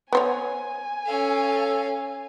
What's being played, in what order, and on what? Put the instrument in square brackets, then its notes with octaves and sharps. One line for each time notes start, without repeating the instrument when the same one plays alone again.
[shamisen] B3 C5 C#5 [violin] G#5
[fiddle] C#4 F5 [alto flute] A4